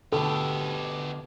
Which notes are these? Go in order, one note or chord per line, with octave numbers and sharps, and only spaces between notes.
B2 D3 B3 G4 A4